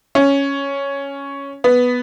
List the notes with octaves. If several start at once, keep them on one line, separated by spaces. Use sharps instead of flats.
C#4
B3